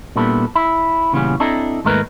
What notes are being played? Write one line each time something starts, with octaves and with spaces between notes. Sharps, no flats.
A#2 G3 B3 D4 E4 A4
E4
A#2 C#3 E3 G3 B3 C#4
C4 D4 E4 A4 D#5 A#5
D#2 G#2 A3 D#4 A#4 B4